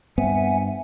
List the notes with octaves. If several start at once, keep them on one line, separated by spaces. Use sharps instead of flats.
G2 B3 C4 E5 F#5 G#5